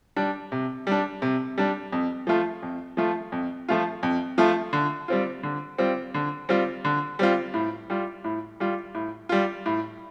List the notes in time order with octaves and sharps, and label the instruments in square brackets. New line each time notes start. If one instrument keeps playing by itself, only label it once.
[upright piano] G3 D4
C3
G3 D4
C3
G3 D4
F2
F3 A3 F4
F2
F3 A3 F4
F2
F3 A3 F4
F2
F3 A3 F4
D3
G3 C4 F4
D3
G3 C4 F4
D3
G3 C4 F4
D3
G3 C4 F4
A2
G3 F4
A2
G3 F4
A2
G3 F4
A2